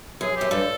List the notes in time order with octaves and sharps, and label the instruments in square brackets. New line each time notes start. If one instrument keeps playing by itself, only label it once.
[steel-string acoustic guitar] F#2 [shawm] G#4
[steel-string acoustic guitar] F#2 [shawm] G4
[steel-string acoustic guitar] G2 [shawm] A4